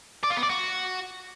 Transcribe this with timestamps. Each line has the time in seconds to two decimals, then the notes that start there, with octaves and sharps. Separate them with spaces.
0.23 D5
0.30 F4
0.36 B3
0.43 D5
0.49 F#4